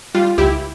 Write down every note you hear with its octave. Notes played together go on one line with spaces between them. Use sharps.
G3 F4
C#2 E4 G4